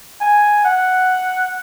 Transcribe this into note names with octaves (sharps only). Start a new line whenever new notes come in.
G#5
F#5